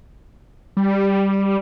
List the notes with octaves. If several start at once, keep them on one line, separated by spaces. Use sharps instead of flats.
G3